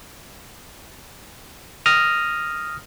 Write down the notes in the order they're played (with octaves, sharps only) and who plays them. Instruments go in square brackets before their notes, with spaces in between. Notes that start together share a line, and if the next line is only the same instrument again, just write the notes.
[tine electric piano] D#6 F6 A#6